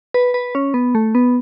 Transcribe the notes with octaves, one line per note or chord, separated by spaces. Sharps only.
B4
B4
C#4
B3
A3
B3